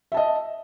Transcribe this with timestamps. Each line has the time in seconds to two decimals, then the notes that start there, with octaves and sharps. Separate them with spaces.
0.12 E5
0.14 A5
0.17 D#5